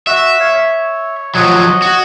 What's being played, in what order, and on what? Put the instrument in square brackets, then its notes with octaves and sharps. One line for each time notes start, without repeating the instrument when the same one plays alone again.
[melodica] F#4 [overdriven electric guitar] E5
[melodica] C#5 F5
C#5
[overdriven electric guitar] F3 F#3 [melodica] C#5 D#5 F#5
[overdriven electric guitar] F#4